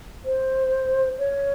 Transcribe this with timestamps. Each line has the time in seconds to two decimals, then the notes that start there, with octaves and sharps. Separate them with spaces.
0.25 C5
1.19 C#5